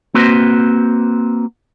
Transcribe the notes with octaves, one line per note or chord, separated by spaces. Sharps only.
A#3 C4 F#4 B4 C5